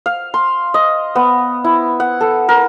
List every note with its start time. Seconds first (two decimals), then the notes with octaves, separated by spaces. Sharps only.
0.06 F5
0.34 C6
0.74 D#5
1.15 B3
1.64 E4
2.00 F#5
2.21 A4
2.49 A#4